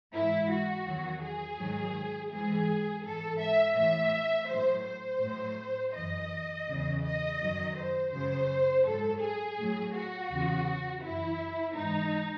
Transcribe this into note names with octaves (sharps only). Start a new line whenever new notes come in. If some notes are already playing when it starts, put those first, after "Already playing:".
G#2 E3 E4
F#4
E2 D#3 F#3
G#4
G#2 D#3 F#3
G#2 E3 G#4
G#2 E3 A4
E5
A2 E3 E5
A2 F#3 C5
C5
A2 F#3
F#2 E3 D#5
E2 C#3 E3
D#5
F#2 D#3 F#3
C5
F#2 C#3 F#3 C5
G#2 F#3 A4
G#4
A2 F#3
F#4
E2 C#3 E3
F#2 E3 E4
G#2 E3 D#4